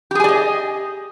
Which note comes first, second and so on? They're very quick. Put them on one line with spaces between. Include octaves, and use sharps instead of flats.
G4 G#4 G#5 D5 D#5